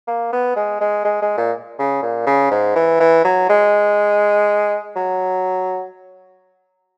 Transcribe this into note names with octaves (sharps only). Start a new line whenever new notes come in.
A#3
B3
G#3
G#3
G#3
G#3
A#2
C#3
A#2
C#3
G#2
E3
E3
F#3
G#3
F#3